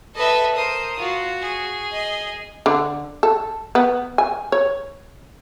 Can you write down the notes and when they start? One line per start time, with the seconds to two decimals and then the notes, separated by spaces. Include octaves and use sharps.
0.15 A4 B4 D#5 E5
0.55 A#4 C5 D#6
0.99 F4 F#4
1.41 G#4
1.92 D#5
2.66 D3
3.23 A4
3.75 B3
4.18 G#5
4.52 C#5